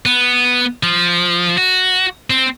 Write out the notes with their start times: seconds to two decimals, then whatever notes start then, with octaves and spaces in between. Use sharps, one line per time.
0.06 B3
0.83 F3
1.58 F#4
2.30 C4